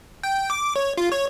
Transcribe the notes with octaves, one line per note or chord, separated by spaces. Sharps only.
G5
D6
C#5
F4
C#5